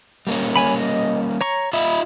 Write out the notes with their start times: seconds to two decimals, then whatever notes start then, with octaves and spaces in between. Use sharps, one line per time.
0.27 G3 A#3 C#4
0.56 C#5 G#5 B5
0.79 D#5
1.41 C#5 A#5 C#6
1.73 F4 D#5 E5 B5